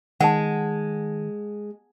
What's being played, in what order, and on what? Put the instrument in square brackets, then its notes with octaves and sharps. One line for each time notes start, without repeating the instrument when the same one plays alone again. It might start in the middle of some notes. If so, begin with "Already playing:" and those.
[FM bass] D#3 [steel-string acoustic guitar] G#3 [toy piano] F#5 A5